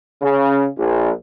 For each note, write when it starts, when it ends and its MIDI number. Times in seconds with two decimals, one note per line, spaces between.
0.22 0.65 49
0.77 1.10 34